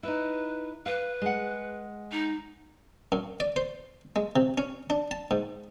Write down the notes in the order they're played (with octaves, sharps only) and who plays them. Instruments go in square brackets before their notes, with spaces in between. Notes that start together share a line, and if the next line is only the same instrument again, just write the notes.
[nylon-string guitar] D#4 E4 [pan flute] B4
[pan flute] B4 [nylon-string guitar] F5
[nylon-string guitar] G#3 F#5
[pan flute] D#4
[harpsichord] F#2
D5
C5
G#3
C3
C#4
D4
A5
G#2